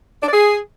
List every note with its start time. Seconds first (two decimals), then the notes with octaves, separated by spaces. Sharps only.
0.23 D4
0.28 D5
0.33 G#4